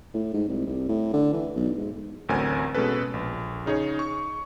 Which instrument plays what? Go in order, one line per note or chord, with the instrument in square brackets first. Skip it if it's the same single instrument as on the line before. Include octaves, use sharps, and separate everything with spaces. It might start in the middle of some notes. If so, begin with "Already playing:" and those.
[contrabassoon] A2
G#2
C2
C2
A2
D3
E3
B1
G#2
[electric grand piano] A1 D2 F#3 C4 A#4 G#5
B2 G#3 C#4 A4 B4
A#1
C#3 D#4 G#4 C#5
C#6